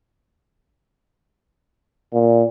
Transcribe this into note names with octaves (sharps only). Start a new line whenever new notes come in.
A#2